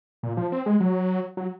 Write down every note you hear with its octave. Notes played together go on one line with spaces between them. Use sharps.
A#2
F3
C4
G#3
F#3
F#3